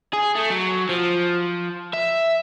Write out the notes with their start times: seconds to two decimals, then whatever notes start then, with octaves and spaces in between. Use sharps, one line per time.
0.13 G#4
0.35 A3
0.50 F#3
0.89 F3
1.94 E5